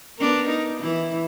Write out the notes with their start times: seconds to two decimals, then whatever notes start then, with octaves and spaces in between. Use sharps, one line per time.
0.18 B3 D4 A#4
0.49 D#4
0.80 E3 E4